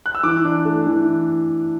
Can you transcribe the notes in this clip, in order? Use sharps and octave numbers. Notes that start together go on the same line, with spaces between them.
F#6
E6
E3 D6
D4
A3
E3